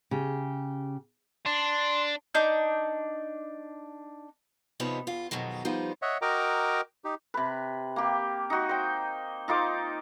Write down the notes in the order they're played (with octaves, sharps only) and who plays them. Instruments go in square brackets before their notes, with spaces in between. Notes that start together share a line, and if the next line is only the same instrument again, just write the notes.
[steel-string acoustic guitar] C#3 G4
[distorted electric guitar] D4 [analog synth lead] C6
[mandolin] D4 D#4 G6
[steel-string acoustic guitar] D#2 C3 F3 B3 D#4 C#5
E2 F4
F2 B2 D#3 F#3 G#3
F3 G3 B3 D#4 C5
[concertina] C#5 D#5 E5 F#5
F#4 A#4 D#5 G5 A#5 D6
D#4 G4
[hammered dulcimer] C3 B4
A#3 G4
D#4 F#4
C5 G5
D#4 F4 C5 D6